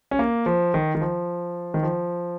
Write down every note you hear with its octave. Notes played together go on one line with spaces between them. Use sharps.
C#4
A#3
F3
D#3
D#3
F3
D#3
F3